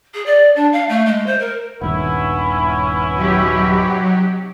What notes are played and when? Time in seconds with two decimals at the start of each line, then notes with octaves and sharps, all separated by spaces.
0.14 G#4
0.26 D5
0.55 D4
0.73 F5
0.89 A3
1.06 G#3
1.26 C5
1.39 A#4
1.81 D#1 G2 D#3 B3 C#4 E4
3.15 C3 F#3 D#4 G4